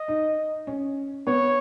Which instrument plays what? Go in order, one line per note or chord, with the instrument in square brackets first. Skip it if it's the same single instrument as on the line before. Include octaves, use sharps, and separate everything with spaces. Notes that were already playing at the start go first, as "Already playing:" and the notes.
Already playing: [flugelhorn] D#5
[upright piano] D#4
C#4
[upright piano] B3 [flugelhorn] C#5